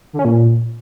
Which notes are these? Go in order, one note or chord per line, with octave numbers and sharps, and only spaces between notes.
D3
C#4
A#2